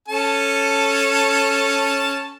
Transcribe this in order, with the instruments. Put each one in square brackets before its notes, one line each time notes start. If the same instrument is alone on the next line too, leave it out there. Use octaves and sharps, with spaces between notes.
[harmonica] C#4 A4 A5